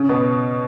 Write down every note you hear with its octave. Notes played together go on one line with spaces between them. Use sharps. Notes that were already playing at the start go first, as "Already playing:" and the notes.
Already playing: C#3 C#4
B2 B3